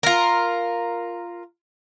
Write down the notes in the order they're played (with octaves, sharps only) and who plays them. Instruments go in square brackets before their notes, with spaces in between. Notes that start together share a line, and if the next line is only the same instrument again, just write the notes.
[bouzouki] F4 A#4